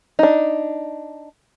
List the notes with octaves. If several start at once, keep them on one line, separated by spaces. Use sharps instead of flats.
D4 D#4